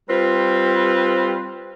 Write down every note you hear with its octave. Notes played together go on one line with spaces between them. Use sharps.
G3 C4 F4 B4